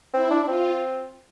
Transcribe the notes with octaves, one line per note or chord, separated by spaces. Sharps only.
C4 E4
D4
D4
C4 F4